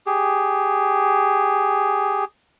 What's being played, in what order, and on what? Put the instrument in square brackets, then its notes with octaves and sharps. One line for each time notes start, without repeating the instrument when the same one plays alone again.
[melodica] G4 G#4